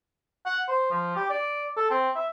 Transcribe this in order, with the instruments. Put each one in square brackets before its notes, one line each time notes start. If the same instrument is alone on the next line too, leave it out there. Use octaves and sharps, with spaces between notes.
[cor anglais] F#5
C5
F3
G4
D5
A4
C4
E5